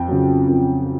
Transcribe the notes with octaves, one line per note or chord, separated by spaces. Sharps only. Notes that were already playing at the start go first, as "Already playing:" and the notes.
Already playing: F2 G5
C#3 F#3
F2